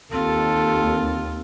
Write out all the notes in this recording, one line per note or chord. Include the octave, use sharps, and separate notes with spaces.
D#2 C4 F4 A4